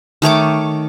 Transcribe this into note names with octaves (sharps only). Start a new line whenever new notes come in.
D#3 A3 C#5 D6